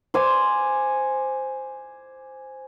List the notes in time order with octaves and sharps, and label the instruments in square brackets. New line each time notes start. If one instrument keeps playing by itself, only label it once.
[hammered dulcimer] C5 G#5 D6